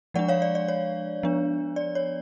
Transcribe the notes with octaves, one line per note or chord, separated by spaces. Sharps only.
F3 G#3 D4 D5 F#5
C#5 F5
D5
D5
C#5
F3 B3 D4
D5
C#5